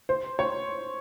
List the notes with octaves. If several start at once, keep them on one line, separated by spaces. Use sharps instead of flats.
C5
C#5